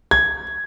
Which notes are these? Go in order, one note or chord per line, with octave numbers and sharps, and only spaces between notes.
G#6